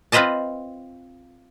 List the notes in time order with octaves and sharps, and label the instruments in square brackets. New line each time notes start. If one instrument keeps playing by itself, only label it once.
[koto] C4 F4 B4 C5 D#5 A5